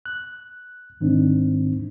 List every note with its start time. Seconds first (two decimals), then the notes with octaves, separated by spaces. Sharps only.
0.06 F#6
1.01 G#2 D#3 C4 D4 D#4